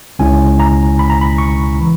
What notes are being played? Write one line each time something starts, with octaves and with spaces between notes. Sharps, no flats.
C#2 C#3 G#3 C#4 E4 G#5
A#5
B5
A#5
B5
C#6
E3